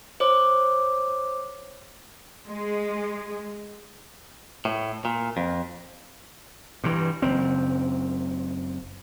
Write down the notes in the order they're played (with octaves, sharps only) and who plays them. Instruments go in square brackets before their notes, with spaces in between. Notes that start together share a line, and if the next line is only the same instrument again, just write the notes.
[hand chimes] C5 C#5 D6
[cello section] G#3
[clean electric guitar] A2
A#2
F2
[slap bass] G2 E3
F#1 C4